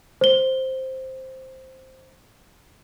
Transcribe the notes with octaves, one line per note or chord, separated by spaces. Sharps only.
C5 G7